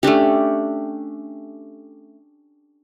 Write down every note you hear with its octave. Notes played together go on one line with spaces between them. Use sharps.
A3 C#4 D4 G4